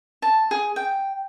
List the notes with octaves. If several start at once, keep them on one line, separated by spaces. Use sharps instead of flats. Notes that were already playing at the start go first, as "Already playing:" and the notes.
A5
G#4
G5